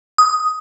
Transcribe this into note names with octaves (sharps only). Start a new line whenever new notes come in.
D#6